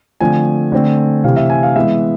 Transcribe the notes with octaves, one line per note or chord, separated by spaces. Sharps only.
D3 F3 A3 C4 G#5
D3 A3 C4
C3 E3 A3 C4 F5
E5
G#5
F5
E3 G#3 B3 E5